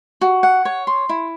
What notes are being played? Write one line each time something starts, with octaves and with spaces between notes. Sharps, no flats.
F#4
F#5
C#5
C6
E4